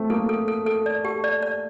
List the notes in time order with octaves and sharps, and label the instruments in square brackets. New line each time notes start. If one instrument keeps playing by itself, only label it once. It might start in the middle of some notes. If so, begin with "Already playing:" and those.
Already playing: [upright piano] A3 C4
[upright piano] A#3 [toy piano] A4
[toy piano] A4
A4
A4
D5
G4
D5
D5